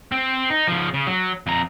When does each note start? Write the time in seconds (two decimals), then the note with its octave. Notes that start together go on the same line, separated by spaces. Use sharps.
0.12 C4
0.50 D#4
0.67 C#3 F3
0.94 C#3
1.07 F#3
1.47 F2 A#5